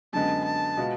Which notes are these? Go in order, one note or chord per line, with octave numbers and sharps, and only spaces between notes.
F#2 D3 G#3 B3 A5
A5
B2 G#3 B3 F4